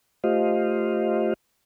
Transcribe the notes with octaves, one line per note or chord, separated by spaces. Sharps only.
A3 F4 G4 C5 D#5 F5